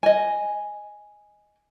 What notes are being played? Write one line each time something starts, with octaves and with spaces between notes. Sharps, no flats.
D#5 G#5